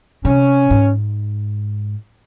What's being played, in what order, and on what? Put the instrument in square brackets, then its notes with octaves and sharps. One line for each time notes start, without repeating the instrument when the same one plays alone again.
[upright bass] C3 [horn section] C#4
[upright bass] G#2